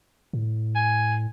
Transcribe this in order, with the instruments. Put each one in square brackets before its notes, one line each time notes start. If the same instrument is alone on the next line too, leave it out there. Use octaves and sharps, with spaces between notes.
[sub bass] A2
[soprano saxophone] G#5